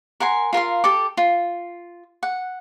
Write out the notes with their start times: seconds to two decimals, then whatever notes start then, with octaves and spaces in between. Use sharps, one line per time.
0.20 A#4 F#5 G#5 C6
0.53 F4 A#4 F5 C6
0.84 G4 A4 D6
1.17 F4
2.23 F#5